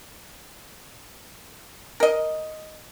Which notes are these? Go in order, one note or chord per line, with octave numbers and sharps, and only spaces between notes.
A#4 D#5